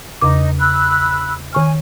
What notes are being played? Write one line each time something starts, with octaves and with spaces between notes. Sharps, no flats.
E2 C#3 D#4 D6
B5 E6 F#6
D#3 G#5 C#6 F6